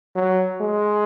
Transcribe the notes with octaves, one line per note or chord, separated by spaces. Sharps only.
F#3
G#3